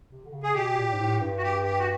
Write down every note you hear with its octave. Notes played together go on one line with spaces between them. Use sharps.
C3
D3
C#3
G#4
B2 G4
A#2
G#2
A2
G2
F#4
G4
G4
F#4